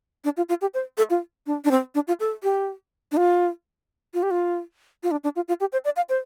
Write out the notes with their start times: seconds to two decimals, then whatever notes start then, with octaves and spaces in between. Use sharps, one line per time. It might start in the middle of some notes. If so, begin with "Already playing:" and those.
0.24 D4
0.37 F4
0.49 F4
0.61 G4
0.74 C5
0.98 A4
1.10 F4
1.46 D4
1.65 D4
1.71 C4
1.95 D4
2.08 F4
2.20 A4
2.43 G4
3.12 D4
3.17 F4
4.14 F4
4.23 G4
4.31 F4
5.03 F4
5.11 D4
5.24 D4
5.36 F4
5.48 F4
5.60 G4
5.72 C5
5.85 D5
5.96 F5
6.09 C5